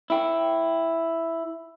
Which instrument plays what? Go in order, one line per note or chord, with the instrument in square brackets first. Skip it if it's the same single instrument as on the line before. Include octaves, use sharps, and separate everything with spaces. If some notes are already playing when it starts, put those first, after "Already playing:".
[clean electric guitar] E4 G5